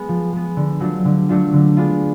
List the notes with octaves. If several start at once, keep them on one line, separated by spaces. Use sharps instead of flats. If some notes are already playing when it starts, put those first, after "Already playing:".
Already playing: G#3 B3
F3
G#3 B3
D3
F#3 A3 D4 F4
D3
F#3 A3 D4 F4
D3
G#3 B3 D4 F4